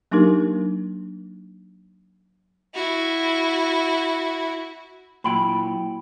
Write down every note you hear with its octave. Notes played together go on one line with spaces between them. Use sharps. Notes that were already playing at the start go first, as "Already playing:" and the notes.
F#3 A#3 D4 D#4 G4 A#4
E4 F#4
A#2 F#3 E4 G5 B5